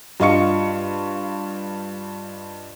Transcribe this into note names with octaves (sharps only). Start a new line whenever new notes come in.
G2 F4 D#5 F5 C#6 C#7